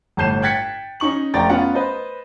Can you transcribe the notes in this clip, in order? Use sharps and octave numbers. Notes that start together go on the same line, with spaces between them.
G1 A2 A5 G6 C7 E7
G5 F#6 G#6 A6 B6 C#7
C#4 D#4 C#6 F#7
F1 D5 G5 A#5 A6
B3 C#4 F4 F#5
B4 C5 D#5